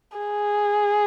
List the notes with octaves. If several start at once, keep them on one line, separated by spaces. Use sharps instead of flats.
G#4